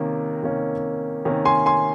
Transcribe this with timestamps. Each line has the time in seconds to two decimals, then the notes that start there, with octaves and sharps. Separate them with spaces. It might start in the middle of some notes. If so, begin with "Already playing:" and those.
Already playing: C3 D#3 A#3 C#4
0.43 C3 D#3 A#3 C#4
1.25 C3 D#3 A#3 C#4
1.45 G#5 C6
1.66 G#5 C6